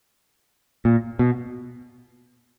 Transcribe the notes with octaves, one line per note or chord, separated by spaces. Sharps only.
A#2
B2